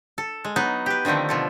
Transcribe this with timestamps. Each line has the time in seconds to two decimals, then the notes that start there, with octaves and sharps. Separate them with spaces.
0.18 A4
0.44 G#3
0.56 F#3 B3 D#4
0.86 G4 B4
1.05 D3 D#3 F3 A3 C4
1.29 B2 F3 A4